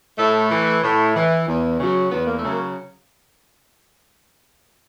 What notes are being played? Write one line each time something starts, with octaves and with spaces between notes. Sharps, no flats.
A2 A3
E3
A2
E3
E2
C#3 F#3
E2 B3
A#3
A3
C#3 F#3
A#3